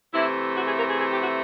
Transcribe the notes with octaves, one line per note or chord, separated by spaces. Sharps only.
C3 E3 A3 E4
F#4
G#4
A#4
G#4
G#4
G4
F#4